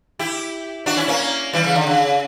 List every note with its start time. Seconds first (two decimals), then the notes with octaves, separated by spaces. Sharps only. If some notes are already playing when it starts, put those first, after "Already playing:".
0.19 E4 G4
0.86 D4 F#4
0.97 C#4 E4
1.08 A#3 C#4
1.53 E3 G3
1.64 C#3 E3
1.76 D3
1.87 C#3